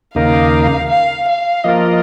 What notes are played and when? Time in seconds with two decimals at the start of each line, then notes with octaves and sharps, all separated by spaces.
0.15 D#2 C#3 A#3 D#4 A#4 F5
0.90 F5
1.28 F5
1.64 F3 A#3 F4 A#4 D#5